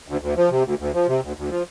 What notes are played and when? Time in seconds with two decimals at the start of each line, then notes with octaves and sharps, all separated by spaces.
0.08 D2
0.21 D2
0.37 F3
0.50 C3
0.65 D2
0.79 D2
0.94 F3
1.08 C3
1.22 D2
1.37 D2
1.50 F3